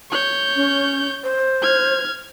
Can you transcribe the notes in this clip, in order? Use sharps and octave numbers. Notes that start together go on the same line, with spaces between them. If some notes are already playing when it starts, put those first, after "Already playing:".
C#5 G6
C#4
C5
F6 G#6